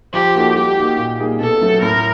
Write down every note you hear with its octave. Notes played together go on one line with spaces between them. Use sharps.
F3 G4
A#3 D#4 F#4 A4
G3 G4
A#3 D#4 F#4
A#2
G3 A#3 D#4 G#4
B2 A4
F#3 A3
A2 A#4